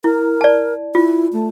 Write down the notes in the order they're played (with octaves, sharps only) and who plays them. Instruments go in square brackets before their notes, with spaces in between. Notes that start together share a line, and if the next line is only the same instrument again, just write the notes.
[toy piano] E4 [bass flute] A#4
[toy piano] D5 A5
[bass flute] E4 [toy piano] F4
[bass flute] A3